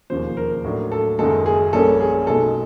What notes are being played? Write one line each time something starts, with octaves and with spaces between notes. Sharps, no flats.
E1 D#2 C#3 F3 C5
A#4
A2 F#3 A#3 D4
A4
F#1 F#2 D#3 G#3 A4
G#4
A#1 A#2 G3 A#3 C#4 A4
G#4
B1 B2 G#3 A4